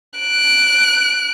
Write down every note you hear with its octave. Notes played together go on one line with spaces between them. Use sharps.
F#6 D7